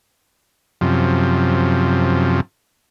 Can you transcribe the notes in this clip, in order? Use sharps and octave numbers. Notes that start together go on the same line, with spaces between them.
F#2 C3 F3